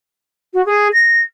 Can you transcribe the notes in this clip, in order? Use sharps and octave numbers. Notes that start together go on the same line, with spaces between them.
F#4
G#4
A#6